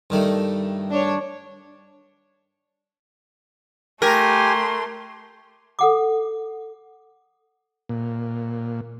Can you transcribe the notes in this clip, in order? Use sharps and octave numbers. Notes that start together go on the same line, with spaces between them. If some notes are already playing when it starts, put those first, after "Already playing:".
G2 D#3 A3
D4 C#5
A3 G4 A#4 G#5 C6
A4 F#5 D6
A#2